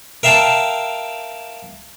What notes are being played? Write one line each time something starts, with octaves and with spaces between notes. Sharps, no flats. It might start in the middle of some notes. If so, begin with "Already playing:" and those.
A#4 E5 F5 G5 A5